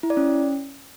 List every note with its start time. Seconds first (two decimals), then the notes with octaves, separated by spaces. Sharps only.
0.03 E4
0.10 D5
0.17 C#4